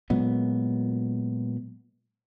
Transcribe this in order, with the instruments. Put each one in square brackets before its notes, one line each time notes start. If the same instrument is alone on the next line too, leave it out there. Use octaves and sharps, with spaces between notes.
[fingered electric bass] A#2 F#3 G#3 B3